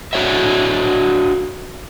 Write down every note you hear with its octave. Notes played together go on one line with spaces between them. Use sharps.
D4 F#4 C#5 D#5 E5